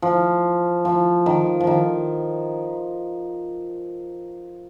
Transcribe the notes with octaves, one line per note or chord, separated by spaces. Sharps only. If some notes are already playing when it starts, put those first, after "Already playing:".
F3
F3
D#3
F3
D#3